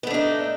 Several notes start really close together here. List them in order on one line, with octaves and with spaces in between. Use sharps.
B3 A3 D4 D#4